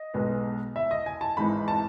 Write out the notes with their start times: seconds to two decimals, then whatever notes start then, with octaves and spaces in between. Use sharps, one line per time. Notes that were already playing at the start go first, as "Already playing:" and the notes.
Already playing: D#5
0.14 B1 B2 G#3 B3
0.76 E5
0.91 D#5
1.06 G#5
1.21 A5
1.37 G#1 G#2 E3 G#3 D#4 B5
1.68 A5